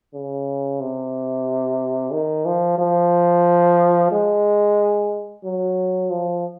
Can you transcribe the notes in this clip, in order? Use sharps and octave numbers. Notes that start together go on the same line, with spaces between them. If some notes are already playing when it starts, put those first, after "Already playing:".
C#3
C3
D#3
F3
F3
G#3
F#3
F3